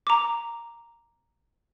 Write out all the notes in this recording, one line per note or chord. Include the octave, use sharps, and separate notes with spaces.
A#5 D6